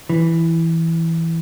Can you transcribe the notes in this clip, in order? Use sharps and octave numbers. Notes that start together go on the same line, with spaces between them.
E3